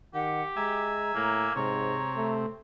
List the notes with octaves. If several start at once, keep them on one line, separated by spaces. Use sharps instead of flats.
D#3 G4 F#5
G#3 E5 G#5 A#5
A2 A#3
G#2 C3 C#5 A#5
A3